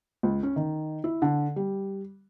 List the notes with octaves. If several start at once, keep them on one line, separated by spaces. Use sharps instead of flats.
C#2
C#4
D#3
E4
D3
G3